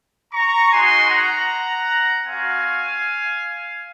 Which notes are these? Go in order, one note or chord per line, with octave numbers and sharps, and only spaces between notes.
A#5 C#6
G#3 D#4 F#4 G#5 C6
F#5 A#5
C4 F#4 F5 G#5